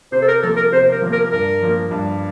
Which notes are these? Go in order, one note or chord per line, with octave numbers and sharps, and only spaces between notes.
C3 C5
A4
A#4
F3 A#3 A4
A#4
C3 C5
A#4
F3 A#3
A#4
G2 A#4
F3 A#3
G2